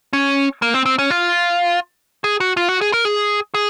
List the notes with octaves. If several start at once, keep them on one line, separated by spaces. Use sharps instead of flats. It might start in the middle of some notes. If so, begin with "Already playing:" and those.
C#4
A#3
C4
C4
C#4
F4
G#4
F#4
F4
F#4
G#4
A#4
G#4
G#4